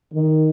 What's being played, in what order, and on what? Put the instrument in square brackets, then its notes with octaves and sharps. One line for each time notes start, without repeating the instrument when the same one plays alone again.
[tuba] D#3